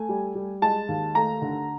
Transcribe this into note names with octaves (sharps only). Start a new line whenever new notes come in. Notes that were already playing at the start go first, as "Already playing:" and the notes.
Already playing: A3 G#5
G3
G3
G#3 A5
D#2
A3 A#5
D3